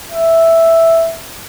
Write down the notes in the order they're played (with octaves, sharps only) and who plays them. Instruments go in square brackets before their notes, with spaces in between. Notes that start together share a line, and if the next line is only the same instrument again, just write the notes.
[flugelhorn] E5